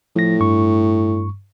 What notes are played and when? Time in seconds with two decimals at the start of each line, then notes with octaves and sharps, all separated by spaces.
0.16 A2 F3 A#6
0.40 G2 C#6